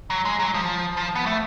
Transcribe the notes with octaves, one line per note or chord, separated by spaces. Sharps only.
F#3
G#3
F#3
F3
F3
B3
A3